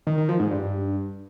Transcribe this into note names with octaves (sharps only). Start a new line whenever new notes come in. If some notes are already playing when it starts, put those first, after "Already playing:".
D#3
D#3
F3
G#2
G2